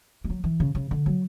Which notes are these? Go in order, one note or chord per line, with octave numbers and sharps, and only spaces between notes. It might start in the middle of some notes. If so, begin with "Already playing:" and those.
G#3
F#3
E3
C#3
C#3
D3
F#3